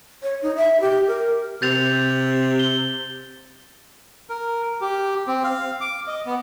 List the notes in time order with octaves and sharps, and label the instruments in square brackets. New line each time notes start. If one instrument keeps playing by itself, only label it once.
[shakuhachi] C#5
D#4
E5
G4
A#4
[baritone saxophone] C3 [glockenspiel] G6 A6 F7
[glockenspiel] G7
[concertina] A#4
G4
C4
F5
D6
D#5
B3